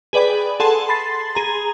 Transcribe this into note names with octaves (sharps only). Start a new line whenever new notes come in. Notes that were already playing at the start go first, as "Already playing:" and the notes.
G#4 B4 D5 G5 B5
G#4 A4 F#5 A5 C6
B5 C6 A6 C7
G#4 A#5